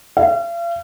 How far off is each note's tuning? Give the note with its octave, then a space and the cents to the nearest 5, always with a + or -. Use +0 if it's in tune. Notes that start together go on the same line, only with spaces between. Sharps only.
F5 -40